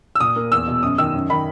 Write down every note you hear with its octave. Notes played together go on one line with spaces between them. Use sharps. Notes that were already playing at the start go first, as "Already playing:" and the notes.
E6
A#2 D#6
A#3
E2 E6
B2
F#2 D#6
D#3 E6
F#2
D#3 B5